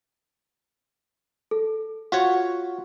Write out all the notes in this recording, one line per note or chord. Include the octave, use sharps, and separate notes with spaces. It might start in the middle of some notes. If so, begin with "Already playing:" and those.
A4
F4 F#4 C#5 F#5